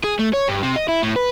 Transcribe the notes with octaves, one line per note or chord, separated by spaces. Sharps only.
G#4
A3
C#5
G2
C3
D#5
E4
A2
B4